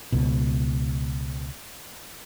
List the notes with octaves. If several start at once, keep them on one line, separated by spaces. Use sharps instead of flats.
C#2 B2